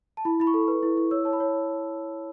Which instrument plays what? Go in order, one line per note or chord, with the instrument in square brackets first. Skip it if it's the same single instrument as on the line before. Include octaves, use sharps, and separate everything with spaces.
[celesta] A5
E4 B5
E4 B5
C#6
A4
B4
E4
E4
C#5 E6
C#5 A5
B5
C#5